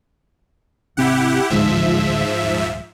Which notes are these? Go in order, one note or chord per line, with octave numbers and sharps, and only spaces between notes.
G#1 C3 C4 E4 G4 F#5
A1 D2 G#2 F3 G#3 E5
D#1